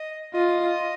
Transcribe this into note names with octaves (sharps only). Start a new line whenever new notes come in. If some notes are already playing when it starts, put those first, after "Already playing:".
Already playing: D#5
F4 D#5